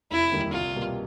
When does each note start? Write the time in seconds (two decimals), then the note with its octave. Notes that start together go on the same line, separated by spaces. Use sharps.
0.11 F1 E4
0.32 D#2 D3 G3 A#3
0.53 C2 F4
0.75 B2 G3 A#3